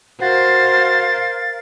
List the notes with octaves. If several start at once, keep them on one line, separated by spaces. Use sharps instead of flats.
F#4 A#4 C5 F5 A6